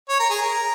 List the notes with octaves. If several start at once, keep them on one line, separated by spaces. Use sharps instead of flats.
C#5
A#4
G#4
A#4